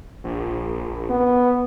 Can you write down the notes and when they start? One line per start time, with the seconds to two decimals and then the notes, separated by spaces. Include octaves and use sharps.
0.24 A#1
1.10 B3